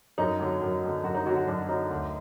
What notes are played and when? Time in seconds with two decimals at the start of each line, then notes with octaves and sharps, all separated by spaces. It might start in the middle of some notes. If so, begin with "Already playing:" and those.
0.18 F#2 D#4
0.39 D3 F#3
0.61 F#2
0.82 D3 F#3
1.04 F#2 F#4
1.15 D#4
1.26 D3 F#3 F#4
1.36 F#4
1.47 F#2 D4
1.69 D3 F#3 D#4
1.90 D2